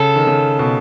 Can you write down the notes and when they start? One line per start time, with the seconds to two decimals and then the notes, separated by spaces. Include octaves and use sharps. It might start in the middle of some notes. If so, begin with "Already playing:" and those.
Already playing: C#3 A4
0.16 D#3
0.27 C#3
0.59 B2